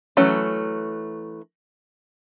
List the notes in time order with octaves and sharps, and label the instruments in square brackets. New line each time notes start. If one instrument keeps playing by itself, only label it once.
[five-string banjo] E3 F#3 A3 C#4